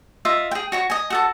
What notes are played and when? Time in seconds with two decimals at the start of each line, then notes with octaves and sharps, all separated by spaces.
0.25 F4 D#5 E5
0.51 G#4 G5
0.72 F#4 C#5 C#6
0.90 D#5 G#5
1.10 F#4 A4 A5